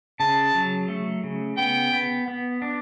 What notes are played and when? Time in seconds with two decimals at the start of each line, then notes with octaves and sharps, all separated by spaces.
0.20 C#3 A5
0.55 F#3
0.88 A3
1.24 C#3
1.58 B3 G5
1.93 B3
2.28 B3
2.62 D4